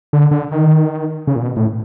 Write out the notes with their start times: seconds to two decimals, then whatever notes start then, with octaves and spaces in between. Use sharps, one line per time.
0.13 D3
0.31 D3
0.51 D#3
1.27 C#3
1.36 A#2
1.41 B2
1.56 A2